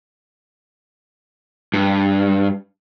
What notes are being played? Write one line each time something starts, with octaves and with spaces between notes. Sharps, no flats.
G2